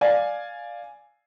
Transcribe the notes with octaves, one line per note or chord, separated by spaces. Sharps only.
D5 F5 G#5